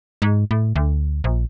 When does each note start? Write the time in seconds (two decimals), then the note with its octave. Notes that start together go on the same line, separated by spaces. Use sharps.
0.22 G#2
0.51 A2
0.76 D2
1.24 A#1